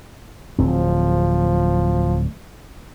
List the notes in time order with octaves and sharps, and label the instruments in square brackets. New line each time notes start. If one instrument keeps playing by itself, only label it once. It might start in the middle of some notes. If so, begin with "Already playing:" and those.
[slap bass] D1 C4 [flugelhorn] F3